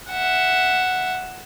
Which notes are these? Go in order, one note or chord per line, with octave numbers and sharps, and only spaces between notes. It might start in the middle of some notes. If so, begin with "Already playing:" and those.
E5 F#5